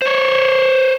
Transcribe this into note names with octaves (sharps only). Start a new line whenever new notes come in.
C5 C#5